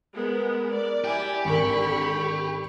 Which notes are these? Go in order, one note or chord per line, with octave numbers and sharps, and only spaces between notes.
G#3 B3 A#4
D5
E4 G4 G#5
G#1 D3 A4 A#4 B5 C#6